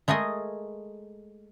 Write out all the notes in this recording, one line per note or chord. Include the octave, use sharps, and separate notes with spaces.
G#3 A3 G#4 A#4 D#5